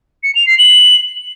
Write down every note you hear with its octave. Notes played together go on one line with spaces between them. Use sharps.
C#7
F7
C7
F#7